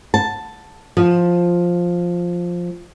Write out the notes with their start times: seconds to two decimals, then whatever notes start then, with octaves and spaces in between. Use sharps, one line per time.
0.14 A5
0.97 F3